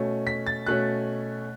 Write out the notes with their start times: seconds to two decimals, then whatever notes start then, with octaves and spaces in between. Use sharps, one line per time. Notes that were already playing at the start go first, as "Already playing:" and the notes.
Already playing: B2 A3 C#4
0.27 B6
0.47 A6
0.67 B2 A3 C#4 F#6